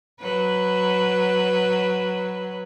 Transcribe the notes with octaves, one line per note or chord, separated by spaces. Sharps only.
F#3 B4